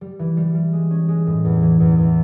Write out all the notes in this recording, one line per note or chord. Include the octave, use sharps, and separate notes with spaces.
G3
E3
G3
G3
G#3
C#4
G#3
A2
E2
E3
E2
E2